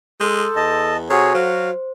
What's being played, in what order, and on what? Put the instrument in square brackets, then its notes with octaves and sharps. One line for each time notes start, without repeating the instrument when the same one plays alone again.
[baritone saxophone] G#3 [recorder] A4 [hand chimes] C6 D#6 G6
[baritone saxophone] E2 [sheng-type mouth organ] D#5 A5
[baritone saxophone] C3 [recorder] F#4 [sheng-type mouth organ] G#4 C#5 [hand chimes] A4 F#5
[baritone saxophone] F#3 [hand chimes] C5 [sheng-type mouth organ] F5